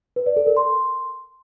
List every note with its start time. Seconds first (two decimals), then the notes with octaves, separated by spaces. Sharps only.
0.16 B4
0.26 D5
0.36 A4
0.47 A#4
0.57 C6